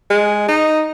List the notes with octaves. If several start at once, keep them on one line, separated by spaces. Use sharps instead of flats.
G#3
D#4